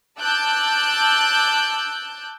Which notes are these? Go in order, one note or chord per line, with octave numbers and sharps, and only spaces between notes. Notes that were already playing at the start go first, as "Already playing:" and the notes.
A5 D6 E6 F#6 G6